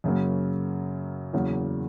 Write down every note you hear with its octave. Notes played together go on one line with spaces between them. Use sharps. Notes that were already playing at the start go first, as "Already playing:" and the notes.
F#2 C#3 F#3 A#3
E2 C#3 F#3 A#3